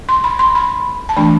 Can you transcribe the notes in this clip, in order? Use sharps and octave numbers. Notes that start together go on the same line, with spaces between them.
C6
B5
C6
B5
A5
E3 A3 D4 B5